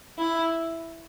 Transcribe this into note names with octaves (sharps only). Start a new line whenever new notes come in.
E4